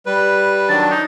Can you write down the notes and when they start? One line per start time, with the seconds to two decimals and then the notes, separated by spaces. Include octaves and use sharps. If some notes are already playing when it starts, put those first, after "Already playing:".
0.06 G3 B4
0.69 D#3 F#3 D4 A5
0.91 D#4